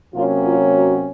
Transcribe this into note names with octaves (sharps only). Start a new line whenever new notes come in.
C3 F#3 A#3 C#4 F4
F4
F#4